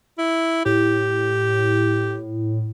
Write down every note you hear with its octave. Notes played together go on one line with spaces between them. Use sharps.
E4
A2 G4